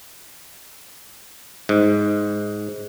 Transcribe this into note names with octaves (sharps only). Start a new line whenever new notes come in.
G#2